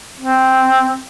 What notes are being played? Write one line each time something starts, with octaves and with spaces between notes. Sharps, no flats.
C4